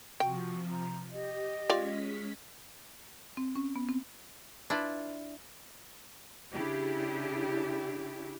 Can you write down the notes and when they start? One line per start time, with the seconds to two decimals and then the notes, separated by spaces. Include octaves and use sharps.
0.20 C3 F3 F#4 G5
0.70 A#5
1.12 G4 D#5
1.70 G#3 C#4 F4 G4 D5 B6
3.37 C4
3.55 C#4
3.76 B3
3.89 C4
4.70 D4 E4 F4 B4
6.54 C#3 D4 E4 G4